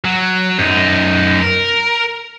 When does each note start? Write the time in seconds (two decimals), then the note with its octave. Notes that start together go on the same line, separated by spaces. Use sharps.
0.05 F#3
0.59 F#2 D#4
1.41 A#4